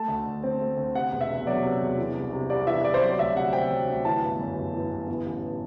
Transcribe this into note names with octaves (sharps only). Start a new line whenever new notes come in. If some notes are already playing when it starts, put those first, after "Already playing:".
Already playing: A3 A5
D2
D3
C4
A3
D2
C3 F#5
E1
E5
E2
F#3 D5
C3
E1
E3
C2
C3
C2 D5
E3 E5
C2 D5
C5
F#3 D5
D2 E5
C3 F#5
C4 G5
F#3
D2
E3 A5
G1
F#2
G1
E3
G1
E3
A1